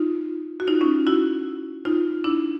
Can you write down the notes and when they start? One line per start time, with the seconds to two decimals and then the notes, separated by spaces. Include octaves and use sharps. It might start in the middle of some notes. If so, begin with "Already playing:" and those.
Already playing: D#4 F4
0.60 F#4
0.67 D#4 F4
0.81 C#4 D#4
1.07 E4 F#4
1.85 D#4 F4
2.24 D4 E4